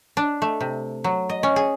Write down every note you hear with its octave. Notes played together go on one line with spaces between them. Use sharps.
D4
A3
C3
F#3
D#5
C#4
G#4